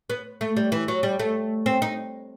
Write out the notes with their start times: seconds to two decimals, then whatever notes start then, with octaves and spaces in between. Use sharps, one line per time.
0.10 B3
0.41 A3
0.57 G3
0.72 E3
0.88 F#3
1.03 G3
1.19 A3
1.66 C4
1.82 D#4